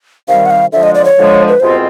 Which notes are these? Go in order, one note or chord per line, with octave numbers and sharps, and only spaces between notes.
C3 D#3 G3 F5
F#5
F5
D3 F3 G#3 E5
D#5
D5
C#5
D3 F3 G#3
B4
C2 B2 G#3 C4 F4 C5